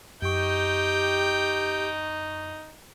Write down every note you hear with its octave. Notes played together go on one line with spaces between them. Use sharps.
F#2 D#4 G4 G5 C#6